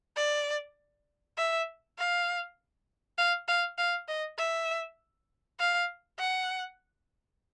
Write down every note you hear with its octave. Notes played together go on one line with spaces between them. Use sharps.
D5
E5
F5
F5
F5
F5
D#5
E5
F5
F#5